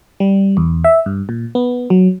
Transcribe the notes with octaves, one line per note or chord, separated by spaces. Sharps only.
G3
E2
E5
G2
A#2
B3
F#3